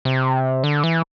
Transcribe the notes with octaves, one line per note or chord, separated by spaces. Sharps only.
C3
D3
E3